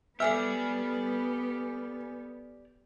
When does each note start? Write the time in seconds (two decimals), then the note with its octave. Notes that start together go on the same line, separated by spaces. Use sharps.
0.20 B3 G4 A4 D5 E5 G#5 F6